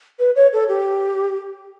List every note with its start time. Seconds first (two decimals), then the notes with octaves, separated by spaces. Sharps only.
0.19 B4
0.35 C#5
0.52 A4
0.68 G4